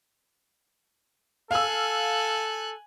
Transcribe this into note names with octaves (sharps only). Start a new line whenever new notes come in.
A4 F5 G#5 E6 F#6